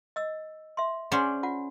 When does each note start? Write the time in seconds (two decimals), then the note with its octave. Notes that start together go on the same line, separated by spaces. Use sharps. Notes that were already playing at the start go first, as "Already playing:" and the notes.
0.16 D#5 E6
0.77 E5 C6
1.12 C#4 G#4 C5 D5 F#5 C6
1.43 F4 F#5